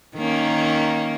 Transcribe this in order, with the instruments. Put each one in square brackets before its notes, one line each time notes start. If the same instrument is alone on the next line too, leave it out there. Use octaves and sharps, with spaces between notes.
[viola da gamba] D#3 A#3 C#4